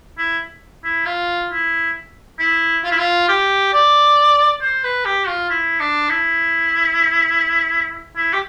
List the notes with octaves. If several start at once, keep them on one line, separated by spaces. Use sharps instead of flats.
E4
E4
F4
E4
E4
F4
E4
F4
G4
D5
C5
B4
G4
F4
E4
D4
E4
E4
G4